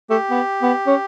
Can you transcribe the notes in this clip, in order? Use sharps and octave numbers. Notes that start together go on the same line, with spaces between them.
A3 G4
B3
B3
C#4